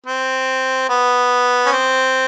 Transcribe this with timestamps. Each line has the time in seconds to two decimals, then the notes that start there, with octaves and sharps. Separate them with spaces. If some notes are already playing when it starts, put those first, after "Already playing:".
0.07 C4
0.90 B3
1.66 C#4
1.73 C4